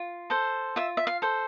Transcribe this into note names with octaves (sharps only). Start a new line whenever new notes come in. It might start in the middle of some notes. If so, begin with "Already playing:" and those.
Already playing: F4
A4 C5
F4 E5
E5
F5
A4 C5